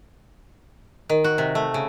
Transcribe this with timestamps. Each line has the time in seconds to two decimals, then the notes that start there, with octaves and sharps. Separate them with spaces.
1.09 D#3
1.24 F#4
1.38 C3
1.55 A3
1.74 C#3